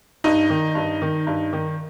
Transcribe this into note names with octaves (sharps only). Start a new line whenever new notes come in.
G2 D#4
D#3
G2
D#3
G2
D#3